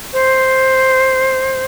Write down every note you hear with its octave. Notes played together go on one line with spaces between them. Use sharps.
C5